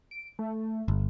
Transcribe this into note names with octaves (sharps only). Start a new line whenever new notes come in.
D7
A3
G1